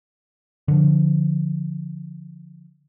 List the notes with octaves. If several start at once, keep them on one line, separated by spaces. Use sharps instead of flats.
D3 F3